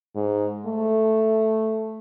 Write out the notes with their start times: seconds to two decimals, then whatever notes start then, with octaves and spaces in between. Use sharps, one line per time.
0.15 G#2
0.66 A3